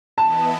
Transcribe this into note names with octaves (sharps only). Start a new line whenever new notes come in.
E3 B3 E4 B4 D#5 A5